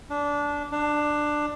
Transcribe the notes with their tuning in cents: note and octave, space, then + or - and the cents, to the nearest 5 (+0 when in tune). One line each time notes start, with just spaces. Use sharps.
D4 -15
D4 +15